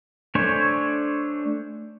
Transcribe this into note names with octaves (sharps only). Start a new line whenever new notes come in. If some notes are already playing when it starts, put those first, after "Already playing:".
A3 D4 C5 C#5 G#5